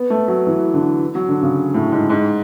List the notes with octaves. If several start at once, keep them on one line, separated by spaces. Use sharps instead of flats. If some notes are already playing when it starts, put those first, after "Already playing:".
Already playing: B3
A3
F#3
E3
D3
F#3
D3
C#3
A2
G#2
G#2